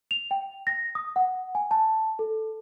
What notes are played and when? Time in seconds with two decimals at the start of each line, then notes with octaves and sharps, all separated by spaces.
0.11 F7
0.31 G5
0.67 A#6
0.95 D#6
1.16 F#5
1.55 G#5
1.71 A5
2.19 A4